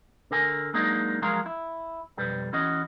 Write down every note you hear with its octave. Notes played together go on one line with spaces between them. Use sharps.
D3 A#4 G#5
F#3 G#3 A#3 D4 D#4
F3 F#3 G#3 G#4 A#4 F5
E4
B1 F2 G3 B4
E3 C#4 F#4 D#5